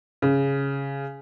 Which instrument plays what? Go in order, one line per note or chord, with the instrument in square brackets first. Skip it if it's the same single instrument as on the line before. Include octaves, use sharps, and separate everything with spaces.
[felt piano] C#3